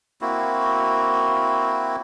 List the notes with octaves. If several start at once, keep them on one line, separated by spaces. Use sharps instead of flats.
A#3 C4 E4 F#4